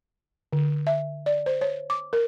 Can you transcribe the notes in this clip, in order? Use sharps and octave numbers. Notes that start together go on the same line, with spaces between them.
D3
E5
D5
C5
C#5
D6
A#4